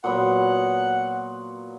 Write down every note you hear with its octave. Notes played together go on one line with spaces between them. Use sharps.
A#2 F#3 B3 F#5